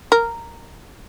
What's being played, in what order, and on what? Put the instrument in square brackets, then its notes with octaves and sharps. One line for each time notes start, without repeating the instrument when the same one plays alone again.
[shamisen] A#4